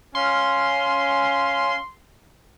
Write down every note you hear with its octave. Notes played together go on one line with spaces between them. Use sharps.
C#4 F5 C6